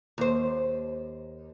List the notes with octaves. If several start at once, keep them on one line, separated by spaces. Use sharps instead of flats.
D#2 C5